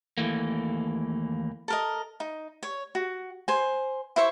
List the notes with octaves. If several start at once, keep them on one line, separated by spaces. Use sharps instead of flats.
D#2 E3 A3 A#3
A4 A#4 D#5
D#4
C#5
F#4
C5 G#5
E4 C5 E5 C#6